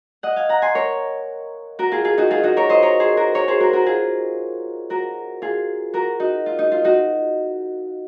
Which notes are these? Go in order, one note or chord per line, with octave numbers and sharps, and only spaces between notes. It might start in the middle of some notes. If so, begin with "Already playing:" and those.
D#5 F#5
F5 G#5
F#5 A#5
G#5 C6
A#4 C#5
F#4 A#4
F4 G#4
F4 G#4
D#4 F#4
F4 G#4
D#4 F#4
A#4 C#5
C5 D#5
A#4 C#5
G#4 C5
F#4 A#4
A#4 C#5
G#4 C5
F#4 A#4
F#4 A#4
F4 G#4
F#4 A#4
F4 G#4
F#4 A#4
D#4 F#4
F4
D#4
F4
D#4 F#4